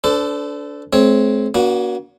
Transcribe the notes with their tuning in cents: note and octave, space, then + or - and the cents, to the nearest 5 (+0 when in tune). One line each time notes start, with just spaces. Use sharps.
D4 -20 A4 +0 C5 -45
G#3 +45 C4 +0 C#5 +0
A#3 +40 D4 -45 F#4 +0